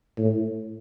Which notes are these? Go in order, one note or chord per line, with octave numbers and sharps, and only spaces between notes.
A2